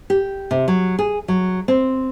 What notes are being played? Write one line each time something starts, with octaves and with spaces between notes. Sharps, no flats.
G4
C3
F#3
G#4
F#3
C4